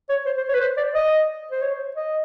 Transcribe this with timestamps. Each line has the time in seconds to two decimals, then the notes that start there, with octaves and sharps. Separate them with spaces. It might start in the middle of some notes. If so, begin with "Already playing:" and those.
0.09 C#5
0.26 C5
0.37 C5
0.49 C#5
0.54 B4
0.60 C5
0.77 D5
0.94 D#5
1.51 C5
1.62 C#5
1.96 D#5